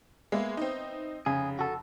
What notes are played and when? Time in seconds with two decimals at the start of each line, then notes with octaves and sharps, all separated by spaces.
0.32 G#3 A#3 B3 E5
0.57 C4 D#4
1.26 F1 C#3 G#4
1.59 F#4 A4